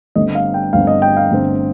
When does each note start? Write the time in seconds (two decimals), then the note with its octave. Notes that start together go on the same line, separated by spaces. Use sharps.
0.15 G1 G2 D3 A3 C4 D#5
0.35 F5
0.54 G5
0.73 G1 G2 D3 A3 C4 F5
0.87 D#5
1.02 G5
1.17 F5
1.32 G1 G2 D3 A3 C4